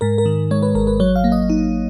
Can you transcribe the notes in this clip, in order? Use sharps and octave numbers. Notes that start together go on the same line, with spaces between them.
G#2 A#4
A#4
D#3
G#3 C#5
B4
G#1 A#4
B4
F#3 C#5
F5
A#3
D#5
D#4